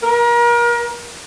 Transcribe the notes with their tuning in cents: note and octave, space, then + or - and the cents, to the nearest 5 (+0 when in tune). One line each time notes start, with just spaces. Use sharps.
A#4 +35